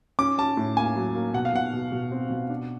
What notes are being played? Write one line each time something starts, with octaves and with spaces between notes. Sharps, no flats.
C#4 D6
C#4 A5
A2
A#3 G#5
F#3
A#3
B2 F#5
F5
B2 F#5
B2
B2
C4
B2
D4